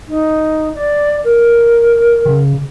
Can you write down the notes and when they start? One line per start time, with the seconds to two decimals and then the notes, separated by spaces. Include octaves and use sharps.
0.08 D#4
0.75 D5
1.24 A#4
2.25 C#3